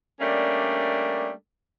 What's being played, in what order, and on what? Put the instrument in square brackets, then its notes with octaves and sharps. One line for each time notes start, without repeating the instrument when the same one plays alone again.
[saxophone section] G3 A3 A#3 C#4 D4